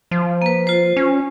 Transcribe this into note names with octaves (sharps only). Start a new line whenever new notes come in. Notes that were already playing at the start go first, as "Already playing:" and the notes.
F3
A#3 B4
F4 C5
C#4